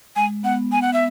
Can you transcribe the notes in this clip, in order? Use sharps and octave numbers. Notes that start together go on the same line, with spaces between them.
G#3 G#5
B3 F#5
B3 G#5
F#5
E5